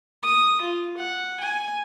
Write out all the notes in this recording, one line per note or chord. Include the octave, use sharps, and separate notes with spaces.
D#6
F4
F#5
G#5